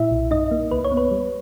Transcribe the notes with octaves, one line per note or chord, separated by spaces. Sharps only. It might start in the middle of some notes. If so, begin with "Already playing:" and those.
Already playing: A#2 E4 E5
B1
G2 D#4 D#5
A#3
C#2 B4
C#5
B3
B4
G3